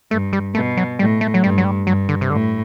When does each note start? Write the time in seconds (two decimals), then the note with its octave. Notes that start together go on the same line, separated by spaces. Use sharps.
0.11 G2 A3
0.33 G3
0.55 B2 A3
0.77 F#3
0.99 A2 G3
1.21 A3
1.34 F#3
1.43 G2 G3
1.58 F#3
1.64 G3
1.87 G2 F#3
2.09 D3
2.21 C3
2.30 A2 D3